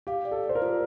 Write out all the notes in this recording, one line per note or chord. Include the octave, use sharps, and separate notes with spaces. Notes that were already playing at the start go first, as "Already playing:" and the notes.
G4 F5
D5
A4
D5
C5
A#4
F4